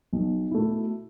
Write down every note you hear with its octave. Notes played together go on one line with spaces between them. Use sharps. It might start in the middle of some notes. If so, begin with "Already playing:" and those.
B1
B2 A3 E4